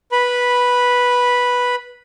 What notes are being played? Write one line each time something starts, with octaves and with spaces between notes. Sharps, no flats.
B4 B5